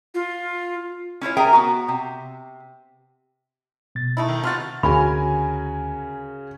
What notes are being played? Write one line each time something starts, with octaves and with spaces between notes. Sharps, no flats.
F4
C#4 E4 F4 C#5
G#4 A#4 E5 G5 G#5 A#5
B3 F#4
C3
B2 A6
A3 D#4 E4
D#3
C3 F4 F#4 F6 A6
D2 C#3 C#4 F#4 A#4 G#5 B5